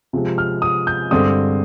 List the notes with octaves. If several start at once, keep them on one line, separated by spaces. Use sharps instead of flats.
C3 F3 G#3 C4
F6
D#6
G6
G2 D3 G#3 C4 D#6